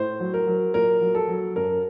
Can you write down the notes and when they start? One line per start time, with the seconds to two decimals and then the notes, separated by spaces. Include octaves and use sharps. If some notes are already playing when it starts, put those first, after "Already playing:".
Already playing: A2 C5
0.20 F#3
0.34 A#4
0.47 F#3
0.74 A#2 A#4
1.02 F#3
1.15 A4
1.28 F#3
1.56 F#2 A#4